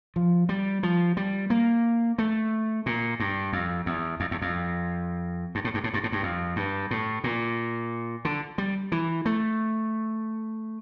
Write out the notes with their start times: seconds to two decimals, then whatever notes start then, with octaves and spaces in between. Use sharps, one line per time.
0.16 F3
0.49 G3
0.83 F3
1.17 G3
1.50 A#3
2.18 A3
2.86 A#2
3.20 G2
3.53 F2
3.86 E2
4.20 F2
4.31 E2
4.42 F2
5.55 G2
5.64 A2
5.74 G2
5.84 A2
5.94 G2
6.04 A2
6.12 G2
6.23 F2
6.56 G2
6.91 A2
7.24 A#2
8.25 D3
8.58 G3
8.92 E3
9.26 A3